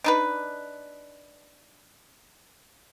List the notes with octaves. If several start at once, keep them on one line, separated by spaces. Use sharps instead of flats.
D4 D#4 B4